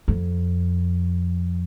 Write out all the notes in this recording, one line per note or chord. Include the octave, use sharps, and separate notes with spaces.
F2